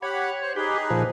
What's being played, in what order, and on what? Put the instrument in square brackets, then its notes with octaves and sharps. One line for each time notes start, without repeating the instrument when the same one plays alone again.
[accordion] G4 F#5 B5 [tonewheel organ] C#5
[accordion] C5
[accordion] D#4 G#4 B4 [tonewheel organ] G4
[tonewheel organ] A#2 F3